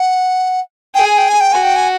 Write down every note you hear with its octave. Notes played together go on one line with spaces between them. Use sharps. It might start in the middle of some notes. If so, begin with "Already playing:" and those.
Already playing: F#5
G#4 G5
G#5
G5
G#5
G5
F#4 G#5
G5
G#5